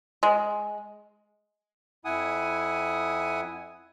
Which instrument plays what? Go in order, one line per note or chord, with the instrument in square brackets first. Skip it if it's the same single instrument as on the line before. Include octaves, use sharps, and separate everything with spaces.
[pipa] G#3
[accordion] F2 E4 F#5 G#5 D#6